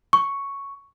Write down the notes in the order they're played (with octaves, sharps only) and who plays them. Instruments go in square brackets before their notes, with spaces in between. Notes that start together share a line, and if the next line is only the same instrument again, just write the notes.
[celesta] C#6